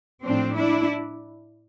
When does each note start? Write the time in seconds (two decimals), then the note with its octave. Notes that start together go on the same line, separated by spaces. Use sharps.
0.23 A2 F3 C4 D4
0.56 D4 E4